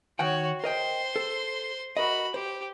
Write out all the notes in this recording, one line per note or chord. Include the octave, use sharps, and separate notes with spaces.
D#3 F#4 C#5 F#5 G5
A#4 C5 D#5 G5 C6
A4
F#4 A#4 D#5 B5
G4 C5